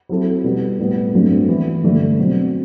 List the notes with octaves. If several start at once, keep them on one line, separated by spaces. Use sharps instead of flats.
F#3 C4 E4 A4
B2 G3 B3
A2 G3 B3
G2 F#3 A3 C4
E3 B3 E4
G2 D3 A3 D4
B2 F#3 C4